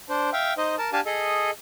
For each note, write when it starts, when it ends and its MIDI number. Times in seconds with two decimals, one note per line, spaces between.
0.09 0.30 62
0.09 0.30 72
0.33 0.54 76
0.33 0.54 77
0.33 0.54 79
0.57 0.75 63
0.57 0.75 72
0.57 0.75 75
0.78 0.90 70
0.78 0.90 81
0.93 1.01 62
0.93 1.01 67
0.93 1.01 77
0.93 1.01 80
0.93 1.01 81
1.06 1.51 68
1.06 1.51 69
1.06 1.51 75